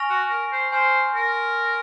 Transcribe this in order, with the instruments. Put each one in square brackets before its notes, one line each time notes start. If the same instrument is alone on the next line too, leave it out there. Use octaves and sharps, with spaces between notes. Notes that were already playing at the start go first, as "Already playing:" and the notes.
Already playing: [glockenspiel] G#5 C#6 F6 A#6 F7
[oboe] F#4
A#4
C5
[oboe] C5 [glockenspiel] G#5 C6 F6
[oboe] A#4